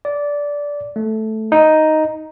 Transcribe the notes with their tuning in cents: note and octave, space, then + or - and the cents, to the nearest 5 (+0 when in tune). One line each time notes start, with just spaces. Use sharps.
D5 -15
A3 -5
D#4 +0